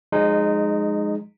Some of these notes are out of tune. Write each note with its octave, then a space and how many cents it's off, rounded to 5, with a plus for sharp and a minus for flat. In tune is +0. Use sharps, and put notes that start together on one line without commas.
F3 +30 G#3 +0 D#4 -20